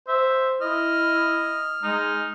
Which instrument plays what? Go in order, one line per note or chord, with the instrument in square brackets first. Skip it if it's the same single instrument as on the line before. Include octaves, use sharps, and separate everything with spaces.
[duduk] C5 [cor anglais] E5
[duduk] E4 [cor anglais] D#5 [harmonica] F6
[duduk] G#3 [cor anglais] D#4